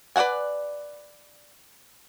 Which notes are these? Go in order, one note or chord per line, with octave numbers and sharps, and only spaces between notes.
B4 D5 E5 F#5 G#5